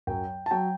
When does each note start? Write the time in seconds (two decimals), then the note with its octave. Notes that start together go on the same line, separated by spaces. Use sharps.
0.07 F#2 F#3 G5
0.46 A5
0.51 F#3 G5